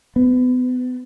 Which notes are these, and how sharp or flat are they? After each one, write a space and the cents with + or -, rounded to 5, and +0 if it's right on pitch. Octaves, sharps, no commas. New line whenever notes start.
B3 +30